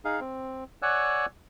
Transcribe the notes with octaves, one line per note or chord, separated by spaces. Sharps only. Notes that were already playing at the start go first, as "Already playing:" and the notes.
D#4 G#4 F5
C4
C#5 D5 F#5 G#5 E6 F#6